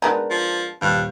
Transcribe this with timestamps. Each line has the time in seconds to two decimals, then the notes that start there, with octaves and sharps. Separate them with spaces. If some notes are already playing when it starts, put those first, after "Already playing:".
0.02 G#3 B3 D4 D#4 A#4 A5
0.30 F3
0.81 D#1 G2 F5 G6